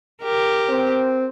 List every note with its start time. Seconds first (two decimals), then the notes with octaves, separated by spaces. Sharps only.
0.23 G4 A#4
0.69 C4